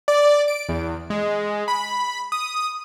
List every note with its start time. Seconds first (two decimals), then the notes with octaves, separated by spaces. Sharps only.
0.08 D5
0.48 D7
0.69 E2
1.10 G#3
1.68 B5
2.32 D#6